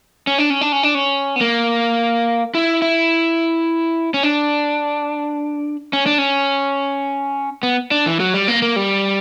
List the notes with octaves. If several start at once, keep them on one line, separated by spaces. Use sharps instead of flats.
C#4
D4
C#4
D4
C#4
D4
C#4
B3
A#3
E4
E4
C#4
D4
C#4
D4
C#4
B3
D4
E3
F#3
G3
A#3
A#3
G3